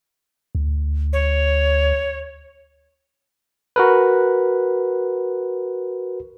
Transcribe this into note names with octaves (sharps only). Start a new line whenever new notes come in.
D2
C#5
F#4 A#4 B4